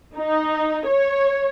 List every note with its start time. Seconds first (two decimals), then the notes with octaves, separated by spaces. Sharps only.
0.16 D#4
0.87 C#5